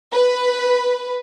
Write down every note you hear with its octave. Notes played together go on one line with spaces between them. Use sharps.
B4